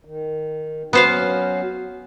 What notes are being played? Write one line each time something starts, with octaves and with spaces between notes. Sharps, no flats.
D#3
F#3 B3 C#4 F#4 C5 F5